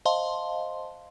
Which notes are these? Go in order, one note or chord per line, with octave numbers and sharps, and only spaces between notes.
C5 D#5 F5 A5 C6